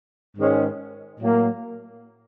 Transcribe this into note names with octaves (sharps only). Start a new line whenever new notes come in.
G#2 D#3 G#3 C#4
A2 F#3 A#3